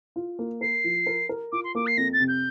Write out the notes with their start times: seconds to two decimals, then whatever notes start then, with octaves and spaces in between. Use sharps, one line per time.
0.16 F4
0.39 A#3
0.61 A#4 C7
0.84 F3
1.06 A#4
1.29 A#4
1.52 F4 D6
1.64 C6
1.75 A#3 D6
1.86 C7
1.97 F2 A#6
2.13 A6
2.20 C3
2.28 G6